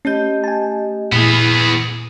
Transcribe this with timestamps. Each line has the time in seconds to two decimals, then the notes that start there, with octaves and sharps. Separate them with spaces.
0.05 A3 C#4 G4 D#5 G6
0.44 G#5 A5
1.12 A#2 B3 E4 G#4